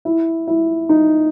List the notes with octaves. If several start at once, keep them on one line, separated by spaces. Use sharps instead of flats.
E4
E4
D#4